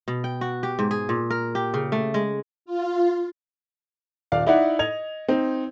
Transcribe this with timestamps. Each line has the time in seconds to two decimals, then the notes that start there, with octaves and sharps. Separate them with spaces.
0.08 B2
0.24 G5
0.41 F#4
0.63 G4
0.79 G#2
0.91 G#4
1.09 A#2
1.30 A#4
1.55 G4
1.74 C#3
1.92 A3
2.14 G#3
2.66 F4
4.32 D#1 D5 F5
4.47 D#4 E4 D5 E5 F#5
4.79 D#5 G#6 F7
5.29 C4 D#4